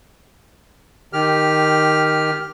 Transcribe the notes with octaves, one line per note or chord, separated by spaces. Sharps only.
D#3 G4 F6